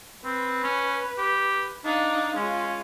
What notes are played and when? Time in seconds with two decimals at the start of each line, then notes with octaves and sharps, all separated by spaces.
0.24 C4 B4
0.63 C#4
1.18 G4
1.85 D4 D#4 F5
2.36 G#3 C#4 F4